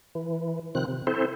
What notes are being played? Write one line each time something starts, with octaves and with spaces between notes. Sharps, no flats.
E3
C3 D#3 F3 C4 F#6
C3
C4 E4 A4 C5